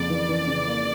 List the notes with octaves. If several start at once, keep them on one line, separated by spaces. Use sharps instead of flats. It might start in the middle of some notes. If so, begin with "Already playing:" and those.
Already playing: F2 C#3 A#3 D5
E3
E3
C#3
A#3